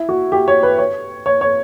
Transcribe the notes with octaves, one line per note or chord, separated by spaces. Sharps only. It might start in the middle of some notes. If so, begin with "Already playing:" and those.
Already playing: E4
F#4
G4
C#5
B4
C#5
C#5
C#5